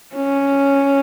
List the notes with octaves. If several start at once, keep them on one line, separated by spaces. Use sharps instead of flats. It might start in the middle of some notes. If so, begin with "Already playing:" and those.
C#4